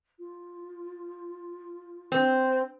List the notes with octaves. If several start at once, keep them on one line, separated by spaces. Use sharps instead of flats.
F4
C4